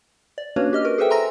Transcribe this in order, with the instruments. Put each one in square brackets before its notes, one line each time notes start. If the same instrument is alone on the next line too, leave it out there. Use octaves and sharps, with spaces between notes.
[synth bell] D5
A#3 C#4 D4 F#4 B4 C#5
G4 D#5 F6
F#4 A#4 B4
G#4 A4 B4 C5 E5 G5
E5 G#5 A#5 C6 E6 A#6